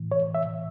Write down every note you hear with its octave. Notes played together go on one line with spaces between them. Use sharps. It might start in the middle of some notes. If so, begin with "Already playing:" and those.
Already playing: A2 E3
C#5
E5